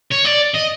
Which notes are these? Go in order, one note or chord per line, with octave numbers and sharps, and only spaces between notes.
C#5
D5
D#5